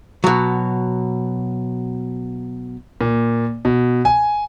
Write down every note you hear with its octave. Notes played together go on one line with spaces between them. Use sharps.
B2 F#3
A#2
B2
G#5